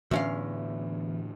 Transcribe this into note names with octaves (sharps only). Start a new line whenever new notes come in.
E2 A2 D3 E3 C#4 F5